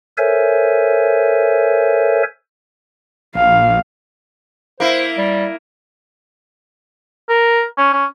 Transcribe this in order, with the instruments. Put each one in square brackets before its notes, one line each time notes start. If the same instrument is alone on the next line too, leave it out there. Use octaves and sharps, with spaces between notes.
[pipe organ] A4 A#4 C5 C#5 E5 G#5
[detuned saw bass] A#1 [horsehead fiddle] F5
[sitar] A#3 E4 [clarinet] C5
[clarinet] G3
[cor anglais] A#4
C#4
C#4